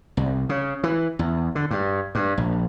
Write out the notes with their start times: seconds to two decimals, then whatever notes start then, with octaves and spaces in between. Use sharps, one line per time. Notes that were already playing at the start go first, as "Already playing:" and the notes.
0.17 C2
0.49 C#3
0.83 E3
1.19 E2
1.55 D3
1.71 G2
2.15 G2
2.37 A#1